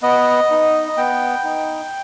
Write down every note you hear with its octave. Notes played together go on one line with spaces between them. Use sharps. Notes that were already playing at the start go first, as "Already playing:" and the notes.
B3 D#5
D#4
B3 G5
D#4